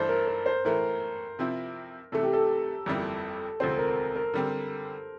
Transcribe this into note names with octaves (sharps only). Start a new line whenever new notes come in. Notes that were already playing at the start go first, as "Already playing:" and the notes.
Already playing: G2 E3 A3 D4 A4 C5
A#4
A#4
C5
A2 E3 A3 A#4
C3 F3 C4 E4
C3 E3 A3 A4
G4
A4
G1 F2 E3 G3 A#3
E1 D2 C3 F3 C4 C5
A#4
A#4
D3 G3 C4